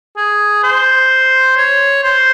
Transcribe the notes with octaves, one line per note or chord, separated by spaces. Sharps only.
G#4
C5
C#5
C5